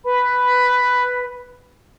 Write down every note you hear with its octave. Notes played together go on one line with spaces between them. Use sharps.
B4 B5